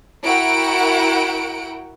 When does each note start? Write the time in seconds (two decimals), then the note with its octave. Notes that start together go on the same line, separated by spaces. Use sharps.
0.22 E4 F#4 A#4 F#5 G5 D7